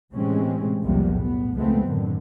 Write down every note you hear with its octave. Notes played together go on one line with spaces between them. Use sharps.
A2 C3 E3 G#3 C4 C#4
B1 E2 C3 F3 G3 A#3
A2 B3
C#2 F3 G#3 A3 B3 C4
F#2 A2 D3 D#3